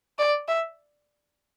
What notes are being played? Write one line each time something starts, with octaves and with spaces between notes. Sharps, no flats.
D5
E5